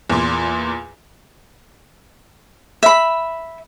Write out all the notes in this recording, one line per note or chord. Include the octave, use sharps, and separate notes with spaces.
E2 A#2
E5 B5